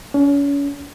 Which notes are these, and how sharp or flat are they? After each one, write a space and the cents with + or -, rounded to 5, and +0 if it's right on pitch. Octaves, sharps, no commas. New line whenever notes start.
C#4 +35